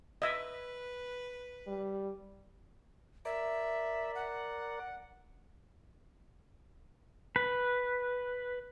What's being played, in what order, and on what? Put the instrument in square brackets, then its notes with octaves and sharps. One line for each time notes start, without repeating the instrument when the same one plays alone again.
[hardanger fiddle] B4 [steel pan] D#5 E5
[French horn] G3
[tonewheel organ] A#4 D5 [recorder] E5
[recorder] F#5
[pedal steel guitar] B4